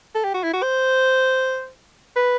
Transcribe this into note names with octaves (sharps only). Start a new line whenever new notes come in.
A4
G4
F#4
E4
F#4
C5
B4